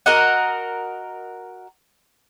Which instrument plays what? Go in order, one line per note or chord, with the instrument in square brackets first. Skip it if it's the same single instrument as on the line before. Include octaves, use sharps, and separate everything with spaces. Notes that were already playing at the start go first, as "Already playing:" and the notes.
[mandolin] F#4 A#4 D#5 F#5